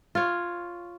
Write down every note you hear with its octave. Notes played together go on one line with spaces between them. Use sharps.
F4 C#5